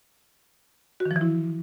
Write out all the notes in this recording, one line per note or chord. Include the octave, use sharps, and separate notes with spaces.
F#4
D#3
F3
E3
E4